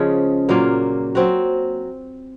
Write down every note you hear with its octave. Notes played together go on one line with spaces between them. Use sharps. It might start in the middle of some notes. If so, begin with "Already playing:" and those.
Already playing: C#3 F3 G#3 C#4
A#2 F#3 A#3 F4
F#3 C4 F#4